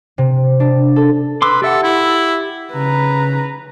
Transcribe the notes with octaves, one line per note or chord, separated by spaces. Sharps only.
C3
D4
A4
B4 C6 D6 E6
G4 A4 E5 F#5
E4
C#3 B4 A#5